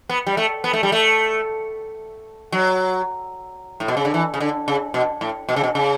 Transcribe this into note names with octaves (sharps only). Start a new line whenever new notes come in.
B3
G3
A3
B3
A3
G3
A3
F#3
A2
B2
C#3
D3
E3
C#3
D3
C#3
B2
A2
B2
C#3
B2
C#3